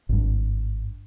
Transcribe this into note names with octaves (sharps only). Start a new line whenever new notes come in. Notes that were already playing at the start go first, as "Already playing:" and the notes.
G#1 G2